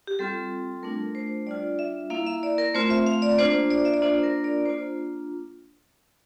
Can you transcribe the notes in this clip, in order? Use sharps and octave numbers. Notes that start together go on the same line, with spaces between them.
G4
G3 C4 F4 A4
A3 D4 F4 A#4
C5
G3 D4 F4 D5
E5
A#3 E4 F5
E5
D5
A#4
A3 C4 F4 C5
E5
F5
D5
A#3 D4 F4 C5
D5
E5
D5
A#3 D4 F4 C5
A#4
D5
A#3 D4 F4 C5